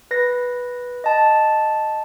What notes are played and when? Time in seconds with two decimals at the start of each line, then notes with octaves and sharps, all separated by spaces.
0.11 B4 A#6
1.04 D#5 A5